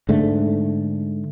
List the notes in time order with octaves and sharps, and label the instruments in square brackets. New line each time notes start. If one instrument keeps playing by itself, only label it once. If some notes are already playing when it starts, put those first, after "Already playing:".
[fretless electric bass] G#2 D3 A3